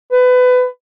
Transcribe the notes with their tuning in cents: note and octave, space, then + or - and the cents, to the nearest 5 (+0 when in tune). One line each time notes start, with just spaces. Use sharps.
B4 +25